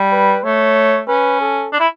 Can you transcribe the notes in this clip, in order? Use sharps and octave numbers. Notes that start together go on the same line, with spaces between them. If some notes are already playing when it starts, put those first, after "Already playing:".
Already playing: G3
B4
A3 C#5
C#4 B4
A4
D4
E4